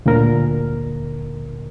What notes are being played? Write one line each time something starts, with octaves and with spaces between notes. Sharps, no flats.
D2 A#2 D3 A#4